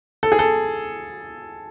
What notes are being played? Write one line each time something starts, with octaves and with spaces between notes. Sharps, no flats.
A4
G#4
A4